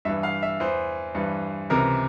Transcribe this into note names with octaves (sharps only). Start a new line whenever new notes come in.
G2 E3 E5
F5
E5
E2 E3 C5
G2 E3
C#2 C3 E3 A#4